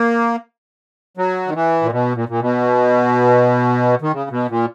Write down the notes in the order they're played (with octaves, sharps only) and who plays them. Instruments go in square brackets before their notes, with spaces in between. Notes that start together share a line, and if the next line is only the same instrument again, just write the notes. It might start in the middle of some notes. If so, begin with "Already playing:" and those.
Already playing: [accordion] A#3
F#3
D#3
E3
A#2
B2
A#2
A#2
B2
D#3
C#3
B2
A#2